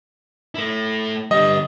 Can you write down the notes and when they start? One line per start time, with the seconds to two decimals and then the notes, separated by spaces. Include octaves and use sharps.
0.55 A3 E4
1.31 D3 G3 D#5